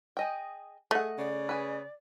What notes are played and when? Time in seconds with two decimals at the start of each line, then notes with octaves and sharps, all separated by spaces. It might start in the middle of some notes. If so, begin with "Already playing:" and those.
0.17 G#4 D#5 G5
0.91 A3 G#4 D#5 F#5
1.18 C#3 D5
1.49 G#4 B4